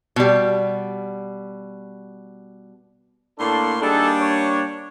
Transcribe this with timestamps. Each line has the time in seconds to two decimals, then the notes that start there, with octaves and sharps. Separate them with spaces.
0.16 B2 G3
3.39 A2 A#3 D4 A4 C6
3.81 G3 A#3 D4 D#4 G#4 A4
4.20 C#5